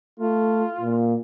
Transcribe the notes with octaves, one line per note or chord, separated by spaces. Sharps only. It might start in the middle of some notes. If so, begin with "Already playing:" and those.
A3 F4
A#2